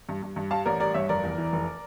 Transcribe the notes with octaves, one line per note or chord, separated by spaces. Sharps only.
G2
G2
G2
G3 F5 A5
A1 A#4 D5
G3 A#4 D5
G2 C#5 E5
F1 A#4 D5
E2
E3
F1